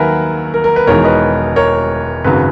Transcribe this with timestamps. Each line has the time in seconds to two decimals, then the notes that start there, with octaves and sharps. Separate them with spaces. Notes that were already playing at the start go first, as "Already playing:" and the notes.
Already playing: D#2 D#3 F#3 A#4 B4 E5 F#5 G#5
0.54 A#4
0.64 A#4
0.76 B4
0.87 E1 E2 D#3 G#3 A#4 C#5
1.04 B4 D#5
1.56 A#4 C#5
2.24 G#1 F#2 C#3 F#3 B4